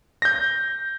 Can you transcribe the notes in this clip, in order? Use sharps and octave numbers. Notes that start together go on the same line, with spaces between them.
G6 A#6